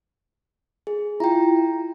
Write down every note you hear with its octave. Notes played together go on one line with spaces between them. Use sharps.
G#4
E4 F4 G5 A#5